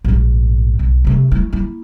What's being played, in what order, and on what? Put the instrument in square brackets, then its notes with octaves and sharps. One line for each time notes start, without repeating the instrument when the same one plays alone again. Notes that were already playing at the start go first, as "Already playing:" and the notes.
[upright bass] A#1 G#2
B1
C3 A3
A3 E4
A#3 E4